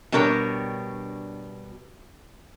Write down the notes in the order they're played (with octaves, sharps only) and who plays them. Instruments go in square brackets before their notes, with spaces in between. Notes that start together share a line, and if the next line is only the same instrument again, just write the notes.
[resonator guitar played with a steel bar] B2 G3 D4 A#4 C#5